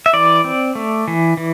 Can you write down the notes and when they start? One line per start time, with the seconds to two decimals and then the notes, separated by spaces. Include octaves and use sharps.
0.06 E5
0.13 E3 D5
0.44 C4
0.75 A3
1.08 E3
1.37 E3